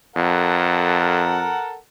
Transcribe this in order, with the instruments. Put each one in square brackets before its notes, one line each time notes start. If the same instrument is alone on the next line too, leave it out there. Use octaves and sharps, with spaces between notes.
[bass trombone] F2 [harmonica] A4 A#4 F#5